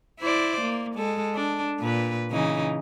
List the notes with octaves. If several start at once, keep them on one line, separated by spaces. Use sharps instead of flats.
E4 C5 D5
A#3
G#3 A4
D4
A#2 B4
C#3 E3 D#4